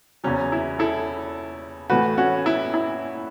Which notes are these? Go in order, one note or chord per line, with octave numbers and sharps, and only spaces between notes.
E2 C#3 F#3 C#4
E4
E4 A4
A2 E3 A3 F#4 B4
C#4 F#4
E4
E4